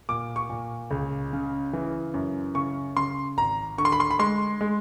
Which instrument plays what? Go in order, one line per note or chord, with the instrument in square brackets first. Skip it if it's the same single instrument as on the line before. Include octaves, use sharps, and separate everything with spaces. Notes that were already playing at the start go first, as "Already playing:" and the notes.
[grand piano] A#2 D6
C#6
A#2
C#2
C#3
E3
F#2
C#3 C#6
C#3 C6
G#1 A#5
D3 C#6
C6
B5
C6
B5
G#3 C6
G#3